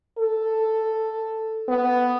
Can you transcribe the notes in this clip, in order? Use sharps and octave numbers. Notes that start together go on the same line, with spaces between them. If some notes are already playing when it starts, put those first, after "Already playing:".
A4
B3